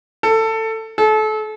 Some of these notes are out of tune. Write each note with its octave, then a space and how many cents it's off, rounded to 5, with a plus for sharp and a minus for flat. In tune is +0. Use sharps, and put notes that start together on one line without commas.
A4 +20
A4 -30